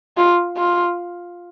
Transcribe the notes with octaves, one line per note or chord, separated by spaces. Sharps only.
F4
F4